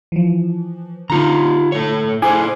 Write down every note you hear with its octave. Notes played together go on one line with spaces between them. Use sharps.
E3 F3
D3 D#4 F4 A#5
A3 C#5
E4 G#4 C5 G#5 D6 G#6